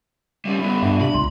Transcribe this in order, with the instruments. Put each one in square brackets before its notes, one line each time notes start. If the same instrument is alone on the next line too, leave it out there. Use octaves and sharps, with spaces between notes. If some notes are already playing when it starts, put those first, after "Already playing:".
[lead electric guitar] G3 C#4 [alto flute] E5
[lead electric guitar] G3 B3 [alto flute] B5
[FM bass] G2 [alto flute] D4 [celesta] E5
[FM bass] C3 [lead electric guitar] B5
[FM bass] C#2 [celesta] C6